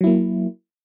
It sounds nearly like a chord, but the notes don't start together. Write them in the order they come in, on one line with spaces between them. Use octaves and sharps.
F#3 E4 A#3